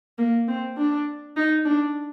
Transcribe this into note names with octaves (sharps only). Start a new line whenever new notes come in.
A#3
C4
D4
D#4
D4